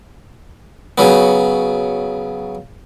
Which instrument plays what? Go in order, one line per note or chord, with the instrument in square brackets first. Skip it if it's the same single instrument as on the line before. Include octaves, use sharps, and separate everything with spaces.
[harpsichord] C#3 F#3 B3